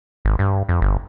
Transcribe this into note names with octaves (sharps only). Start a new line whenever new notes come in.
G#1
G2
F2
G1